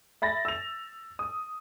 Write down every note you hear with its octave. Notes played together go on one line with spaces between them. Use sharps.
E5 B5 A6 A#6
E6 F7
D#6